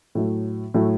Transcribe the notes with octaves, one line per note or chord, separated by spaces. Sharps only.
A2 F#3 A3
A2 F#3 A3